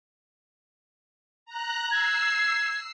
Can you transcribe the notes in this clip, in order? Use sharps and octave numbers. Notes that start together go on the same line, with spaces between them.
A#5 F#6
E6 G#6 C7